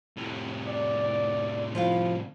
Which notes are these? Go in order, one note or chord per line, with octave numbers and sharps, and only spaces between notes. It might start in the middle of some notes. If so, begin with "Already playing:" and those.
A2 C3
D5
F3 E4 F5